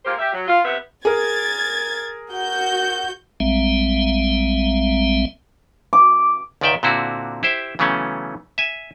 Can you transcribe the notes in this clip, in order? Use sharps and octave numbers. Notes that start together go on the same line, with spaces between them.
G#3 A#3 F4 G4 A#4 C5
G4 E5
F#3
F4
C3 B3 E5
G#4 A#4 G#6 A6
F#4 G6
A#1 G3 G#3 C4 E5
D6
C#2 G#2 D#3 D5 E5 G5
A#2 D3 C4 E4 F#4
E4 G4 C5 E5
C#3 E3 F#3 A3 B3 C#4
E5 G#5